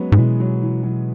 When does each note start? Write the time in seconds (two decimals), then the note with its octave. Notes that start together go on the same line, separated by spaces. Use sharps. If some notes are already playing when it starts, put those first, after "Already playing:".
Already playing: F#3 G#3 B3 C#4
0.12 G#2
0.18 B2 E3 G#3
0.40 F#3
0.62 E3
0.84 F#3